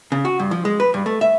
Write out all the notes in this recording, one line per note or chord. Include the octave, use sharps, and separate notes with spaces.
C#3
F#4
G2
F3
G#3
B4
G2
A3
E5